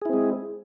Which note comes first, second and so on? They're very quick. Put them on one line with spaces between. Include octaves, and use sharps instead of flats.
G#4 E4 C4 G#3